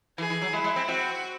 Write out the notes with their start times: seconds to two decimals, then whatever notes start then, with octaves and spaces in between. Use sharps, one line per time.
0.18 E3 G#4
0.30 E3
0.42 F#3
0.53 G#3 E4
0.64 G#3
0.76 C4
0.88 C4 F#4